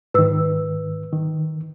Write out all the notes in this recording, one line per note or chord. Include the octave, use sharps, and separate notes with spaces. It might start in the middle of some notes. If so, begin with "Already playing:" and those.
G#2 D#3 B4 E6
D#3